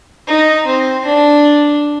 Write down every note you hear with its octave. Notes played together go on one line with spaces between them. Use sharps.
D#4
C4
D4